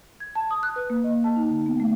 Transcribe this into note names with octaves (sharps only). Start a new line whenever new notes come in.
G#6
A5
D#6
F#6
B4
A#3
D#5
A5
D#4
D3
B3
A3